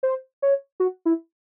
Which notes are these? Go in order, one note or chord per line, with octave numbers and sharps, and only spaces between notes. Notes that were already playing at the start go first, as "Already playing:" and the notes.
C5
C#5
F#4
E4